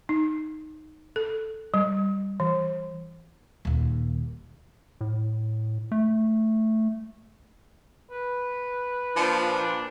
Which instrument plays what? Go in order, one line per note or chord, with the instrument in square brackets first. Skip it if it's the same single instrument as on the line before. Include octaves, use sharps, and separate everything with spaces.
[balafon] D#4
A4
G3
E3
[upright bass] D#1 D#2
[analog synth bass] A2
A3
[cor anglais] B4
[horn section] A#2 D4 [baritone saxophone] F3